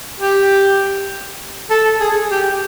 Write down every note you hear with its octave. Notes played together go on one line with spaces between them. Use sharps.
G4
A4
G#4
G4